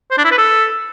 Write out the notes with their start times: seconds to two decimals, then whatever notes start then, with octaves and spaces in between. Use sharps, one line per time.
0.11 C5
0.18 D4
0.25 E4
0.31 B4
0.38 A4